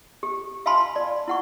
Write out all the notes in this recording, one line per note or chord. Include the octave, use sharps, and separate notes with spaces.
G4
E5 F5 G#5 A5 B5 C6
D5
E4 F#5 C#6